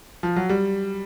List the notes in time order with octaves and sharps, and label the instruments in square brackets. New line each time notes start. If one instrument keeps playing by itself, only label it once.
[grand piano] F3
F#3
G3